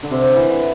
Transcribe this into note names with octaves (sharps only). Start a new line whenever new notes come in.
D3
C3
D3
E3
D3